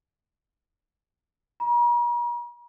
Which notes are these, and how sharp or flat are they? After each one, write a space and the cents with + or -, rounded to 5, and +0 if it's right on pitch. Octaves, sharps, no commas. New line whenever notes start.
A#5 +45